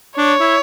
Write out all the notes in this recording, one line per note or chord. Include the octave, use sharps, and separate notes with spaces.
D4 C#5
E4